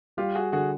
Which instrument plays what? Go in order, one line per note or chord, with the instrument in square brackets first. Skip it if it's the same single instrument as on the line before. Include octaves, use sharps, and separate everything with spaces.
[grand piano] G3 [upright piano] F4 G4
[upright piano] F#4 G#4
[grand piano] D3 [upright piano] F#4 G#4